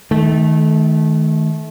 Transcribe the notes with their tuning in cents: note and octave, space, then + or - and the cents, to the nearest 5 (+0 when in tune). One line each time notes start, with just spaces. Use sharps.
D#3 +20 A3 -20